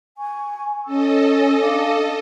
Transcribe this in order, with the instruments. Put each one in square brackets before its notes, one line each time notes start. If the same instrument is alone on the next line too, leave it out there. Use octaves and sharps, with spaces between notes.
[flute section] G#5 C#6
[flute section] C#4 G#5 E6 [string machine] A4 D#5
[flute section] D4 F5 D6